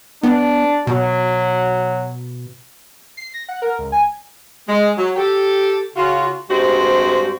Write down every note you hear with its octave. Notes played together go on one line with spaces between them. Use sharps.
B3 D4
B2 F#3
C7
A#6
F#5
A#4
C#2
G#5
G#3
F#3
G4 A4
C#3 F4 F#4
G2 G3 G#3 C4 F#4 C5